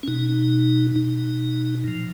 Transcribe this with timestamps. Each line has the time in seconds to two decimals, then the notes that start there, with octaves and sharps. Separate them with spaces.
0.03 C#4
0.08 B2 D#4
0.96 B2 D#4
1.84 A#2 F3